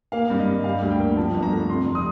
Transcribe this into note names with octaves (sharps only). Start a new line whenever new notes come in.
A#3 F5
G2
D#5
G2
G3 F5
D2
G5
A#3
F3 A5
G1
A#5
A3
C3 C6
F1
D#6